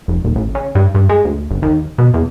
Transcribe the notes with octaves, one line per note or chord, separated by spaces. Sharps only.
F1
D#1
A1
C#3
G2
G2
G#3
D2
G1
D#2
B2
E2